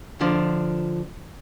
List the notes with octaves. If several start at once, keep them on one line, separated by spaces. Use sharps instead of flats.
D3 F3 D4